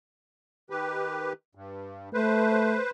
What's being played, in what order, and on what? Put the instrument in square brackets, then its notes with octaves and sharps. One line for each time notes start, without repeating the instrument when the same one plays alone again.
[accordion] D#3 G4 B4
G2
[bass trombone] A3 [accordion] B4 C5